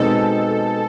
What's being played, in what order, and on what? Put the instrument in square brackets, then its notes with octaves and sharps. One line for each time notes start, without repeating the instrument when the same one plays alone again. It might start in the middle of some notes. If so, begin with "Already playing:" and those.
Already playing: [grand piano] B2 G#3 C4 D#4 [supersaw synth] A4